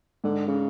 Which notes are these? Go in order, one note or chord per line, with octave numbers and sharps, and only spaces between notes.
G#2 D3
C#3